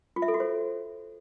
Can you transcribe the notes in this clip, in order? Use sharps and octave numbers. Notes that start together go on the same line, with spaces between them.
F4
E5
A4
F#4
C5